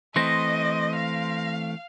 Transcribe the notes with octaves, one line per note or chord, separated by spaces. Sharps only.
E3 A3 C4 D#5 C6 A#6
F5